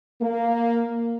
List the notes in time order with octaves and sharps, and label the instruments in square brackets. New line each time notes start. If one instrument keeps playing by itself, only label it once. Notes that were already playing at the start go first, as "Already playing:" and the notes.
[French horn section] A#3